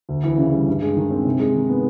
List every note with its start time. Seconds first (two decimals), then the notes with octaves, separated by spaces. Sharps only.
0.09 D2
0.24 E3
0.38 C#3
0.53 G3
0.67 G2
0.82 G#3
0.97 D#3
1.11 C4
1.25 C3
1.40 G#3
1.54 D#3
1.69 B3